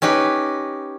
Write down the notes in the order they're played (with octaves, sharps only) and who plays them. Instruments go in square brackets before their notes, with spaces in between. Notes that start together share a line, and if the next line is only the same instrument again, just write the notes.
[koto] C#4 D#4 G4 B4